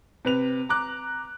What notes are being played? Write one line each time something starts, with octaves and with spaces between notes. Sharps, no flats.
C3 B4 F7
A#5 D6 F#6